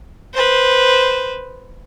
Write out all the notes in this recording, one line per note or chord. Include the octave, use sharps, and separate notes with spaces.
B4 C5